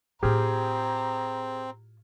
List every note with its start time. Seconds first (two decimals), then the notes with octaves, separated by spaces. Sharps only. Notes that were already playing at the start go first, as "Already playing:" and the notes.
0.23 A2 C4 F4 G4 G#4 A#5 F6